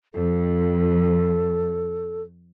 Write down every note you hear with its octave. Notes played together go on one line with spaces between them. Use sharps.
F2 A4